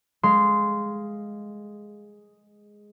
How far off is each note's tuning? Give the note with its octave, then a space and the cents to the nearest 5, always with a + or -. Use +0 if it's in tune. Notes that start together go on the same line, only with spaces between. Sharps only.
G#3 +0 F5 +0 C6 -10